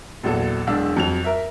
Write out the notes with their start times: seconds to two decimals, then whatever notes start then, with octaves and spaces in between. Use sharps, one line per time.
0.23 A#1 E2 F#3 A4
0.67 E1 B1 D4 F5 E6
0.96 F2 F#3 F7
1.24 A#4 E5